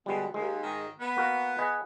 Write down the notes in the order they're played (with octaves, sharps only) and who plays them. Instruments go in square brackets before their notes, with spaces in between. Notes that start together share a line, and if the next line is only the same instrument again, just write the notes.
[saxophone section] B2 D3 B3 [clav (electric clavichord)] G3 G#3
[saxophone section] D#2 [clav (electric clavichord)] G#3
[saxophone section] G#2 D#3
B3
[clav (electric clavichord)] A#3 F#4 A#4
G#4 B4 D#5